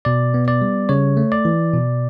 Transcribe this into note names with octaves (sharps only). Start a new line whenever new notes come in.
B2 D5
B3
D5
G3
C#3 C#5
A3
D5
E3
B2